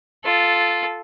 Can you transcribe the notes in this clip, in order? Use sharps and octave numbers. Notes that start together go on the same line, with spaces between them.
F4 A4